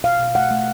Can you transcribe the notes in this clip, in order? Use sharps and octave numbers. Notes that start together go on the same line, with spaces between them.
B2 F5
B2
A3 F#5
A3